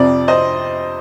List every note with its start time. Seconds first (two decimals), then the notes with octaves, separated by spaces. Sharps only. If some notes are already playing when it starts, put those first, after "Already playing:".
Already playing: F2 C3 F3 D5
0.28 C5 D#5